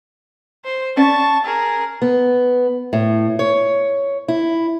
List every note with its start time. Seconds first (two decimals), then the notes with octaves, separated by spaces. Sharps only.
0.65 C5
0.97 C#4 D5 F#5 A5 C#6
1.45 G#4 A#4
2.02 B3
2.93 A2
3.39 C#5
4.28 E4